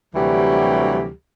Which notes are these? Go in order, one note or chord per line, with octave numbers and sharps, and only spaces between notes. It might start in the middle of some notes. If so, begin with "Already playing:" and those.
D2 C3 E3 F#3 G3 G4